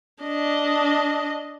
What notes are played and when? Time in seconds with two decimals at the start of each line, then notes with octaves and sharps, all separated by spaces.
0.23 D4 D#5